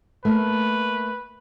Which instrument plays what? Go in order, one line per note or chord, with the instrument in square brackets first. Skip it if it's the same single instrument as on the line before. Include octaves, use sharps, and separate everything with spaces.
[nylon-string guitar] A3 A#3 [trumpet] B4